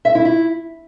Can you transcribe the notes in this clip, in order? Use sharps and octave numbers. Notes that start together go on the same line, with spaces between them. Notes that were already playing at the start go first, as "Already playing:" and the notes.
E5
E4
E4